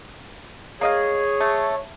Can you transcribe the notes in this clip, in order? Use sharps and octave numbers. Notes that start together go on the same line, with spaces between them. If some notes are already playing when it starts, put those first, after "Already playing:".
A#3 G#4 C#5 D#5 F5
A3